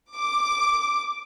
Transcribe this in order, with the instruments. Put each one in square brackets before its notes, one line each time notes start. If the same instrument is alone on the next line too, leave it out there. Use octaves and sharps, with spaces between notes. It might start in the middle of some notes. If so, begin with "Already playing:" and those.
[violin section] D6